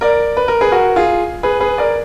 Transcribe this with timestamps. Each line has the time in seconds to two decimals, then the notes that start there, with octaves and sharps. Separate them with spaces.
0.01 A#4 D5
0.37 B4
0.48 A#4
0.61 G#4 B4
0.72 F#4 A#4
0.96 F4 G#4
1.43 G#4 B4
1.60 G#4 B4
1.78 A#4 D5